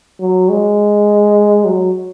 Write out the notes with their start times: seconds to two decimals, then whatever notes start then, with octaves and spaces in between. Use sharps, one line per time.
0.20 F#3
0.49 G#3
1.65 F#3